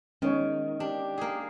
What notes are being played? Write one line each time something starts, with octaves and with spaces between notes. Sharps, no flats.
D#3 G#3 B3 C#4 C#5
D4 G4
A#3 G#4